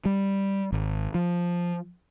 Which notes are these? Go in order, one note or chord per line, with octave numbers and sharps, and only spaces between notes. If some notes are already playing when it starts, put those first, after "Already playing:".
G3
G#1
F3